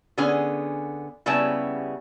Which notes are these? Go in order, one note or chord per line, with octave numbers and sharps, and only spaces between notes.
D3 B3 C#4 G#4 G#5
C#3 G3 B3 C#4 E4 A5